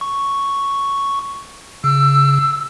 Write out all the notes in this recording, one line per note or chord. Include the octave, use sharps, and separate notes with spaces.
C#6
C#3 E6